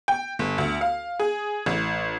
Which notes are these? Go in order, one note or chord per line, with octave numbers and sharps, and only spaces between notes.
G5
G1
D2
F5
G#4
A1